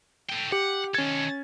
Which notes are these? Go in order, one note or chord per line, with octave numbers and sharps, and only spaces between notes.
A4 G5
G4 F#5
D#3 C#4 A4 G#6